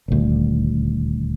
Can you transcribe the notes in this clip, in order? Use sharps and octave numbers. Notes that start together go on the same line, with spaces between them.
D#1 D2